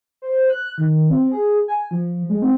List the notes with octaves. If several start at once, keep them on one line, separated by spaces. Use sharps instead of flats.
C5
F#6
D#3
C4
G#4
G#5
F3
G#3
C4